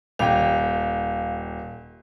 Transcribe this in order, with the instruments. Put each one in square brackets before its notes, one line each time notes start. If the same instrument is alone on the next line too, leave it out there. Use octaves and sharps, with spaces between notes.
[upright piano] D#1 G5 [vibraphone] F5